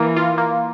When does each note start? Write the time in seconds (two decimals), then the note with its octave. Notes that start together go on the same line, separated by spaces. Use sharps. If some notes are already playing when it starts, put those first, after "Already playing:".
Already playing: E3 A#3
0.17 F4
0.38 A#3